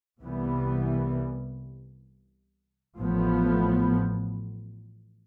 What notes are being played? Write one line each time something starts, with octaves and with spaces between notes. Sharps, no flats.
C2 C3 E3 G3 B3
A1 A2 F3 B3